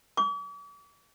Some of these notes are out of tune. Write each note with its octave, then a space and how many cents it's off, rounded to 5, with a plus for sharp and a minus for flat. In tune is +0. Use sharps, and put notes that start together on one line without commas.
D6 -45